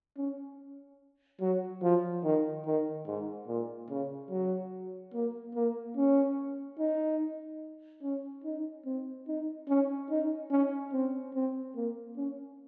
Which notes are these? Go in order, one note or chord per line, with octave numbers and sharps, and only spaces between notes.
C#4
F#3
F3
D#3
D#3
G#2
A#2
C#3
F#3
A#3
A#3
C#4
D#4
C#4
D#4
C4
D#4
C#4
D#4
C#4
C4
C4
A#3
C#4